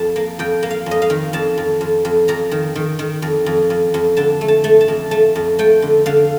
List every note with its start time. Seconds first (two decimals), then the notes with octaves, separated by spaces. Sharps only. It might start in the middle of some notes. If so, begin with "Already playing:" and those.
Already playing: F2 A5
0.16 A#3
0.39 F2 G5
0.63 A#3
0.71 F5
0.86 F2 D#5
1.02 F5
1.10 D#3
1.33 F2 A5
1.58 F2
1.81 F2
2.05 F2
2.28 F2 A#5
2.51 D#3
2.76 D#3
2.99 D#3
3.22 F2
3.46 F2
3.70 F2
3.94 F2
4.17 D3 A5
4.41 A3
4.48 A5
4.64 A3
4.81 A5
4.88 F2
5.11 A3 A5
5.35 F2
5.59 A3 G5
5.82 D3
6.06 D3 F5